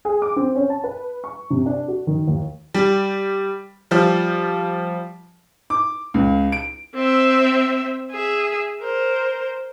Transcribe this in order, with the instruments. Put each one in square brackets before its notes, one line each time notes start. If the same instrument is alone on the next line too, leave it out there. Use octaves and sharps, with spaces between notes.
[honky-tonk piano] G#4
D6
C4
C#4
A5
B4
C#6
C3
D4
F#4
D#3
D#2
G3
F3 G3
[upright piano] D6
C#2
D7
[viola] C4 E5
G#4 E5
A#4 C5